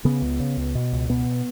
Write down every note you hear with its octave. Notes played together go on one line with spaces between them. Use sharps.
C#3 B3
C#2
C#3
C#2
B2
C#2
B2 B3